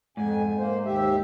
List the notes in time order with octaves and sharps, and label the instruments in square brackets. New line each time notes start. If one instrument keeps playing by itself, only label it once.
[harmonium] F2 G#5 [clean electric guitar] G#2
[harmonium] A#3 C5
D#2 G4 E5